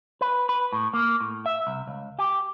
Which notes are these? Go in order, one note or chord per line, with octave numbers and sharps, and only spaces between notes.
B4
B4
A2
A#3
A2
E5
C2
C#2
G4